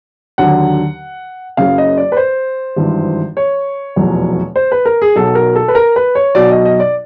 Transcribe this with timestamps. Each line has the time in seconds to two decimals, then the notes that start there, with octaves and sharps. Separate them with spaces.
0.38 D#2 D3 F#3 F#5
1.57 F#1 F#2 C#3 F5
1.78 D#5
1.97 D5
2.12 B4
2.17 C5
2.76 G#1 G2 E3
3.37 C#5
3.96 F1 E2 B2 F#3
4.56 C5
4.72 B4
4.85 A#4
5.02 G#4
5.15 B1 B2 F#3 A4
5.35 A#4
5.56 A4
5.68 B4
5.75 A#4
5.96 B4
6.15 C#5
6.35 B1 B2 F#3 D5
6.51 D#5
6.65 D#5
6.80 D5